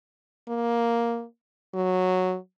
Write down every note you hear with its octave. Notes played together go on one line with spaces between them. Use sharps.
A#3
F#3